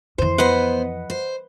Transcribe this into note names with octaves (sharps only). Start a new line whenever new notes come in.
F2 E3 C5
B3 B4 C5 D#5 F#5
C5